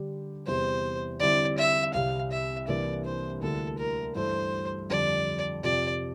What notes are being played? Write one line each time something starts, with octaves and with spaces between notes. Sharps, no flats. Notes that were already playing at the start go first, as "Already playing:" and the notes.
Already playing: D3 G3 D4 G4
E2 C3 E3 G3 C5
D3 G3 C4 E4 D5
E5
C2 C3 G3 F5
E5
C2 C3 E3 A#3 D4 D5
C5
D2 D3 G3 A#3 E4 A4
A#4
G2 E3 A3 E4 A4 C5
F2 D3 G3 D5
F2 C3 F3 D5